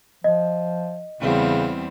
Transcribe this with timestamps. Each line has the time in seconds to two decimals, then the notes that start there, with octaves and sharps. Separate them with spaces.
0.24 F3 D#5
1.21 E2 C#3 G3 C4